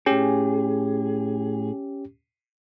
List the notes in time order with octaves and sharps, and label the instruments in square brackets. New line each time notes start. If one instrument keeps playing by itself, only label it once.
[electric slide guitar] A2 G#4 [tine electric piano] C#4 G4